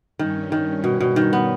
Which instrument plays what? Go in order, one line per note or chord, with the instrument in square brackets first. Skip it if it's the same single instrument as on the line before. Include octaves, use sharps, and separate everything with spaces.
[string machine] G2 G3 C#4 [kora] D#3
[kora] D#3
B2
B2
D#3
B3